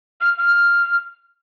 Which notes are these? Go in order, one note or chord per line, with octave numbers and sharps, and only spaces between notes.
F6
F6